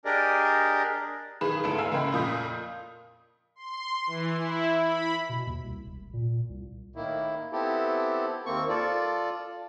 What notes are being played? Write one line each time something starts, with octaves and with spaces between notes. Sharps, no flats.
D4 G4 G#4 A#4 D5 D#5
B1 D#3 G#4 B4 B5 E7
G#1 D2 B3 E4 A4 E7
E5 F5 G#5 A#5 E6
G#2 C#3 G#3 A#3 G5 B5
F2 A#2 D#6 G6 B6
C6
E3
E4
B5
B2
D#2
C2
E1
A#2
C2
A2 D#3 A#3 E4
B3 C4 E4 G4 A4
D#2 A#3 C4 C#6
F4 A4 D5